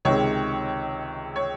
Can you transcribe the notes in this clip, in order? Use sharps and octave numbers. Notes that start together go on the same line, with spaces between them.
C#2 C3 D#3 G#3 C#5
C#5